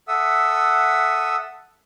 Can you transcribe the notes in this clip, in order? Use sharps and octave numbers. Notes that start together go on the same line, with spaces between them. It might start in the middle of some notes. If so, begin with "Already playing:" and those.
A4 E5 F#5 D#6 E6